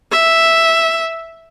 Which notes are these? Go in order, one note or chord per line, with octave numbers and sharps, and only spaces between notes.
E5